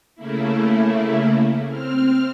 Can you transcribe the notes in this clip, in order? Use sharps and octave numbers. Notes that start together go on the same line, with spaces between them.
C#3 A3 A#3 E4
C4 F6